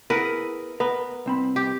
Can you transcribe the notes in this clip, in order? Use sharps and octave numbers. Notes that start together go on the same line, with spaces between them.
B3 E4 G#4 A#4 B4 F#5
B3 A#4
C2 C4 B5
G4